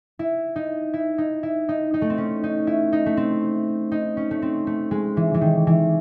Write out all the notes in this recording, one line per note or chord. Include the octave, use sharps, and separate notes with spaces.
E4
D#4
E4
D#4
E4
D#4
D#4
A3
C4
C#4
D#4
E4
D#4
A3
C4
D#4
C#4
A3
C4
A3
G#3
E3
E3
D#3
E3